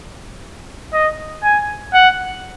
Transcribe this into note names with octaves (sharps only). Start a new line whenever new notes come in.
D#5
G#5
F#5